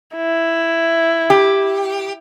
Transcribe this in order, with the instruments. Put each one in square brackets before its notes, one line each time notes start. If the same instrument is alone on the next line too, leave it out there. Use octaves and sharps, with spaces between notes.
[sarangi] E4
[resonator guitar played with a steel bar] G4